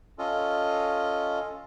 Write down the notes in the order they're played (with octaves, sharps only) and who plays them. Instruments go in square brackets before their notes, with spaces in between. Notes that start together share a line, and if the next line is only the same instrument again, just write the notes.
[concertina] C#4 F4 A4 D#5